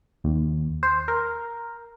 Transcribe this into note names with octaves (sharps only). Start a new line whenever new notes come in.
D#2
C5
A#4